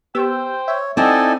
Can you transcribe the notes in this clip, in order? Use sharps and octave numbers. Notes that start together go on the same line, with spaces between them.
B3 G4 C5 G5 E6
C#5 E5
C4 D#4 E4 A4 D5 D#5 F#5 G#5